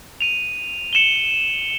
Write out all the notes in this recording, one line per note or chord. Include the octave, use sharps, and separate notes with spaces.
D#7 F7
C#7 E7 F#7 G7